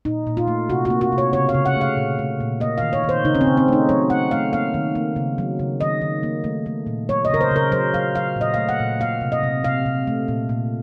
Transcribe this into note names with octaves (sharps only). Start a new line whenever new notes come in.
A#2 D#4
A#2
F4
A3
C3 F#4
F#4
A#3
F#4
C3
C#5
C#3 C#5
F5
C#3
F#5
A3
F5
A#2
A3
A#2
A#3 D#5
D#3 F5
C#5
D#3
C5
C#3 D#4
C#4
C4
C#3
C4
A3 D#4
F#3 C#5
A3 F#5
A3 F5
A#3 F5
D#3
A#3
C#3
F#3
C#3
D#3 D#5
D#3
A#3
A3
A3
A#2
F#3 C#5
D#5
C#3 A#4
C5
C#3 A#4
F#3 C5
F#3 F5
F#3 F5
A#2 D#5
A3 F5
F#5
A#2
A#3 F5
C3
D#5
C3
C3 F5
C3
A3
A#2
A#2